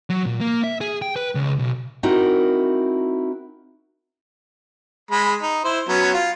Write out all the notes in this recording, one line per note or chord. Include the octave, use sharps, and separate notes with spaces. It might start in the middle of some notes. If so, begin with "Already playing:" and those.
F#3
A#2
A#3
E5
G#4
G5
B4
C#2
B1
C4 D#4 E4 F#4 A#4
G#3 B5
D#4
E4 C5
F#3 B3 C#4
F4